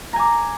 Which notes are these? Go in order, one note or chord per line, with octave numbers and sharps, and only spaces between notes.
G#5 A#5 D6